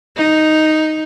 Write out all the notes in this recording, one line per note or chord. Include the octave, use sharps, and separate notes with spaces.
D#4